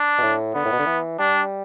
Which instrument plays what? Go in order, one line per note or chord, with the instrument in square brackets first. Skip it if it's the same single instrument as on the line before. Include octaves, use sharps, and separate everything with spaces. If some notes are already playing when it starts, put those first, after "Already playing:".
Already playing: [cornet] D4
[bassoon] B2
A2
[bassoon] D3 [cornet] B3
[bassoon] A2
B2
D3
E3
[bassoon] G3 [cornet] D4